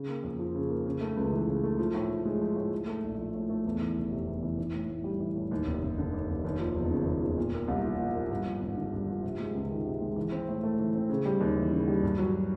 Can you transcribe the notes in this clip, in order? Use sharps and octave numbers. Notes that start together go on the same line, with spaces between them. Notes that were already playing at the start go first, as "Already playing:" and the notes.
Already playing: C#3
A#3
F2
F3
C#3
A#3
C#3
A3
C#2
E3
C#3
A3
F3
A2
A2
G#3
F3
A2
A2
A3
A#1
F3
A2
A3
E2
E3
F1
C3
E2
E3
E3
A2
A2
G3
E3
A2
D#2
F1
F1
D3
D#2
F1
D#2
F3
E1
C#3
D#2
F3
A#2
A#3
C2
F3
A#2
A#3
G2
F3
G#1
D3
G2
F3
C3
G#3
C#2
D#3
C3
G#3
E3
C4
A2
A3
E3
C4
C#3
G3
D#2
E3
C#3
G3
G2
F#3